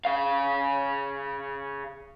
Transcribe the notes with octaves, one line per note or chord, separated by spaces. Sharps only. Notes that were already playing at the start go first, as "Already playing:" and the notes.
C#3 F5